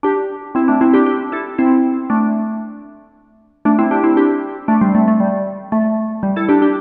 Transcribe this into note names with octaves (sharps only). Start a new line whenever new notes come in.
D4 G4
C4 E4
A3 D4
C4 E4
D4 G4
D4 G4
E4 A4
C4 E4
A3 D4
A3 D4
C4 E4
D4 G4
C4 E4
D4 G4
A3 D4
G3 C4
A3
A3
G3
A3
G3
E4 A4
D4 G4
D4 G4